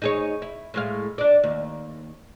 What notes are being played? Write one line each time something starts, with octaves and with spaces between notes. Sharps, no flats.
D#4 G#4 C#5
E4
A2 G#3 F5
D4 D5
D#2